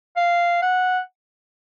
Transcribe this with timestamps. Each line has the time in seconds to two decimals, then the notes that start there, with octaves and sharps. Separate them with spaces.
0.17 F5
0.62 F#5